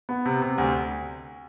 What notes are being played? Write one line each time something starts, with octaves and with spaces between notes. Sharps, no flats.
B3
C3
C3
D2